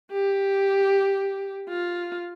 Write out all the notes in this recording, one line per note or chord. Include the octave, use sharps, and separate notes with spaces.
G4
F4